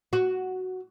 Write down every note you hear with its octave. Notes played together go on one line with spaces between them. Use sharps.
F#4